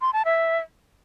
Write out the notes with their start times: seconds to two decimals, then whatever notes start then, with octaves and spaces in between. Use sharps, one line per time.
0.01 C6
0.13 A5
0.25 E5